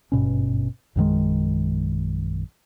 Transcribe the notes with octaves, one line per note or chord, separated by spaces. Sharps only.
G#1 G2 B2 C#4
A#1 F#2 D#3 G#3